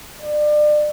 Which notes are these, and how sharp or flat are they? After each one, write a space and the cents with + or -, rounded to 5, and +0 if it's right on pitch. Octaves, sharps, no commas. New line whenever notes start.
D5 +30